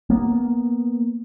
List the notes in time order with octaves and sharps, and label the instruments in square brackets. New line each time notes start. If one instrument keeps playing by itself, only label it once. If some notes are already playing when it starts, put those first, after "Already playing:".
[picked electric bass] A#3 B3